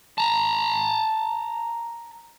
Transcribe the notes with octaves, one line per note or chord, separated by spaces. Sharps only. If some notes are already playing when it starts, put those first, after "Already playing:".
A5 A#5